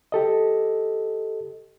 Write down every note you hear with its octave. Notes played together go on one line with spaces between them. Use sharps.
G4 A4 D#5